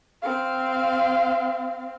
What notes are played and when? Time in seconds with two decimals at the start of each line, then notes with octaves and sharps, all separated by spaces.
0.22 C4 F5